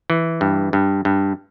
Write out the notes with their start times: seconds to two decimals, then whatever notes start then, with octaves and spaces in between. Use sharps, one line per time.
0.10 E3
0.41 G2
0.73 G2
1.05 G2